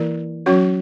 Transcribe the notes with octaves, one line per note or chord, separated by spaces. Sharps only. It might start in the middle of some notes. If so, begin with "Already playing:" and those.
Already playing: E3 A#3 E4 A#4 D5
F#3 C#4 F#4 C#5